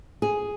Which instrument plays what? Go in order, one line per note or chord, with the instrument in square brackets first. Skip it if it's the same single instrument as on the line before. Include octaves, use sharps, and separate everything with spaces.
[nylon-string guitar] G#4